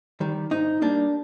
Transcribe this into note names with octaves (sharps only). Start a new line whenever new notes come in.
D#3 G3
G#2 D#4
G3 A#3 D4